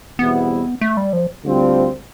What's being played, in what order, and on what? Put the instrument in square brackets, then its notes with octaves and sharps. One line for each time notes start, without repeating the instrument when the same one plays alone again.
[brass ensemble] E2 B2 G3 C4 E4 [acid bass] B3
[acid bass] A3
G3
F3
[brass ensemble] D2 D3 G3 C4 F4